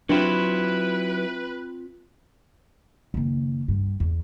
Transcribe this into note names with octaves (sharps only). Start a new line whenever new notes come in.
F#3 C4 D4 E4 F4 B4
F#1 D#3
G2
E2